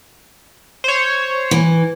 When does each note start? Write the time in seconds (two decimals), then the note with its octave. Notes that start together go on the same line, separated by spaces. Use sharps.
0.84 C5 C#5
1.51 E3